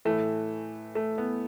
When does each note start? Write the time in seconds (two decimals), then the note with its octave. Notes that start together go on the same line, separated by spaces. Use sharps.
0.05 A2 E3 A3
0.95 A3
1.18 B3